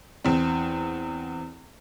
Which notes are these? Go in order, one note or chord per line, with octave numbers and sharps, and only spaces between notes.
E2 C4